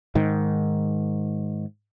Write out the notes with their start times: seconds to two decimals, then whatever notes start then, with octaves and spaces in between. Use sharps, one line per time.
0.15 G#2 D#3